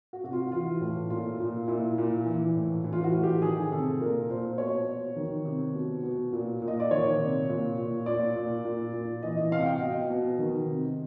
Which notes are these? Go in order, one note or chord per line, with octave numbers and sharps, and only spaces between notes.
F#4
C3 F#4
F4
F#4
E3 F4
A2
A#2 F4
A#2
A#2 E4
A#2
E3
A2
E3
F4
F#4
A2
G4
D#3 G#4
C3 A4
A#2 A#4
A#2 C5
B2 C#5
B2
D#3
C3
B2
B2
A#2
A#2
D#5
D5
D#3 C#5
C3
A#2
A#2
A#2 D5
A#2
A#2
A#2
E3 D#5
D#5
C3 F5
F#5
G5
B2 D#5
B2
D#3
C3